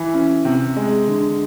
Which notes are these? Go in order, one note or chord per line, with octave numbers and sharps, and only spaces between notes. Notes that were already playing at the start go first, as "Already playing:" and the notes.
Already playing: E3
C#4
C3
G#3
D3